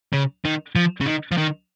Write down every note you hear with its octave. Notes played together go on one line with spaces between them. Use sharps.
C#3
D#3
F3
C#3
D#3
F3
D#3